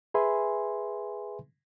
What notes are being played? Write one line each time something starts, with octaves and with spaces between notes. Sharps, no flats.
G#4 B4 E5 G#5 B5 C6